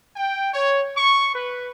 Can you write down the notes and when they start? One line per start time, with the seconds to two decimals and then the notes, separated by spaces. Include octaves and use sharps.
0.16 G5
0.52 C#5
0.96 C#6
1.34 B4